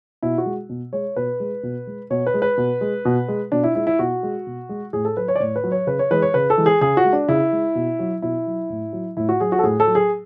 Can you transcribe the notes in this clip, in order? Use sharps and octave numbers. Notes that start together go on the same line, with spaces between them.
B2 E4
F#4
G#3
B2
G#3 C#5
B2 B4
G#3
B2
G#3
B2 C#5
B4
G#3
B4
B2
G#3
B2
G#3
B2 D4
E4
G#3 E4
E4
B2 F#4
G#3
B2
G#3
A2 G#4
A4
F#3 B4
C#5
D5
A2 C#5
B4
F#3
C#5
C#3 B4
C#5
E3 G#3 B4
C#5
C#3 B4
A4
E3 G#3
G#4
C#3 G#4
F#4
G#3
D4
C#3 E4
G#3
B2
F#3
B2 E4
F#3
A2
F#3
A2 E4
F#4
F#3 G#4
F#4
A4
A2 G#4
A4
F#3
G#4